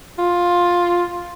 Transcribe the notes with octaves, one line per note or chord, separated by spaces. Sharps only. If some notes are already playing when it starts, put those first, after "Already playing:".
F4